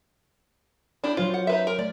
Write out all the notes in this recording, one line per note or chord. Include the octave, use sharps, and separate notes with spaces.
D4 E4 G4
F#3 F4 C5 C#5
F#5
D#4 B4 E5
A#4
A3 D5